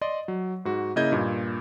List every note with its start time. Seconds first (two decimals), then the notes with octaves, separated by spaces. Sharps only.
0.01 D5 D#5 C6
0.28 F#3
0.65 G#2 F#4
0.96 C#3 A#3 E4 D#5 G6 G#6
1.12 G2 A#2